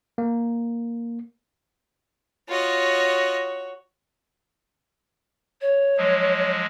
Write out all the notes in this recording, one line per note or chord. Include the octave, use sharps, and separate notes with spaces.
A#3
F4 F#4 C#5 D#5
C#5
F3 F#3 G#3